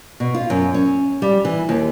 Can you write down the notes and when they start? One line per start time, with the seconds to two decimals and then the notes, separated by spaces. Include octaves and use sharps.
0.20 B2
0.34 F4
0.50 F#2
0.74 C#4
1.22 G3
1.45 E3
1.69 D#2